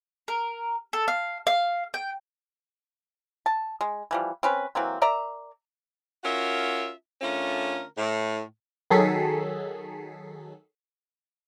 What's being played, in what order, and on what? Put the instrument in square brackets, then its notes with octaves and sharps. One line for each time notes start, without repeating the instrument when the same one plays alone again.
[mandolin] A#4
A4
F5
F5
G5
[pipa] A5
G#3
E3 F3 G3
C4 C#4 B4
E3 F#3 A#3 C4
A#4 D5 E5 A#5
[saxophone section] C#4 F4 F#4 A#4 E5
D3 A3 C#4 F4 A#4
A2
[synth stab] D#3 F#3 G#4 A4 B6 C7